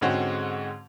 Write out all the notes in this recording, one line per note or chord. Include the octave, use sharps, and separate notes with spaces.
G#2 D3 G#3 C4 C#4 F#4